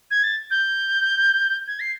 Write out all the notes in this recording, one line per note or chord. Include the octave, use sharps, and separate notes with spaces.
G#6
A6
G6
G#6
C7